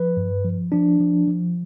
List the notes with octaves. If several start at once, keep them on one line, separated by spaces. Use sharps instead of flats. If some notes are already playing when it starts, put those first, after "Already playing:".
Already playing: F3 B4
G2
F3
F3 D4
F3
F3